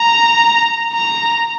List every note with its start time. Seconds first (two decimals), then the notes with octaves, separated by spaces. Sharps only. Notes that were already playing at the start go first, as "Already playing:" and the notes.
Already playing: A#5
0.93 A#5